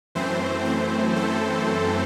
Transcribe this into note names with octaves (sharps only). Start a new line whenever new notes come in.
F#2 E3 A3 C4 C5
C5
A4